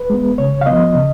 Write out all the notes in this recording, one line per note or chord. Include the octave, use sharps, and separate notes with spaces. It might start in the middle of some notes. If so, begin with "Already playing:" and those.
Already playing: B4
G#3 B3
C#3 C#5
F5
F3 B3 D#5
C#3